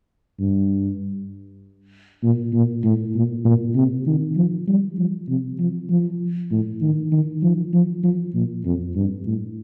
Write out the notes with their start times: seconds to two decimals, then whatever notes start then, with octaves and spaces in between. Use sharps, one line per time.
0.39 G2
2.23 A#2
2.53 A#2
2.84 A2
3.15 A#2
3.45 A#2
3.75 C3
4.07 D#3
4.37 F3
4.67 G3
4.98 F3
5.28 C3
5.59 F3
5.90 F3
6.51 A2
6.82 D#3
7.12 D#3
7.43 F3
7.73 F3
8.03 F3
8.34 A#2
8.65 F2
8.96 G2
9.26 A2